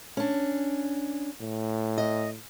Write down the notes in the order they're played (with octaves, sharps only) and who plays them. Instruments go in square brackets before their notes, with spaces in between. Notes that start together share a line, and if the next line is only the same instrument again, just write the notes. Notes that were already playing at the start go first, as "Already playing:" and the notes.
[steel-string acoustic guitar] C#4 D4
[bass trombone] A2
[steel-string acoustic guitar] D#5